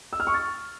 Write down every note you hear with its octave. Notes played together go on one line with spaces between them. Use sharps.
E6
F6
C#6
A6